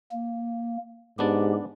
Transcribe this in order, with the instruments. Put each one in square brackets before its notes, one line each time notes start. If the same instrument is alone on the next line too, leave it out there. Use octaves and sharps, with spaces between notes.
[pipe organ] A#3
[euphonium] G#2 [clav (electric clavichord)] B3 D4 D5 [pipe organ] G4